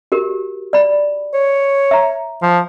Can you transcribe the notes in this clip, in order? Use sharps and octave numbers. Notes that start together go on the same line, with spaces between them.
F#4 G4 A#4
D5 B5
C#5
E5 A#5
F3